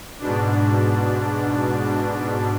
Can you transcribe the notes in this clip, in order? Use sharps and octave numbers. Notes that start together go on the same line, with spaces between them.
G#2 B2 D4